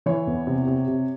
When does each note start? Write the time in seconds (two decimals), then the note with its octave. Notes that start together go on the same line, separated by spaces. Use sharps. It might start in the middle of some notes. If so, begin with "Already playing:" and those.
0.06 E3 C#5
0.27 E2
0.47 C3
0.68 C3
0.88 C3